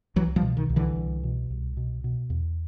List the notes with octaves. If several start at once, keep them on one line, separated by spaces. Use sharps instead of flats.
C2 E3 F#3
F3 G3
B2
D#3
C2
D3 E3
C2
B2
C2
B2
B2
E2